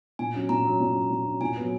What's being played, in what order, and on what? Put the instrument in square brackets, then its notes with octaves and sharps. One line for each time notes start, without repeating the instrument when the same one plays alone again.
[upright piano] A#2 [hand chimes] G#5
[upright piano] F#3 C#4
[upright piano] A#2 [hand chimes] A#5
[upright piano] F#3 C#4
A#2
F#3 C#4
A#2
F#3 C#4
[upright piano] A#2 [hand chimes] G#5
[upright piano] F#3 B3